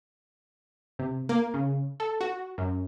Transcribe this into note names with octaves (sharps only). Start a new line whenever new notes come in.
C3
A#3
C#3
A4
F#4
F#2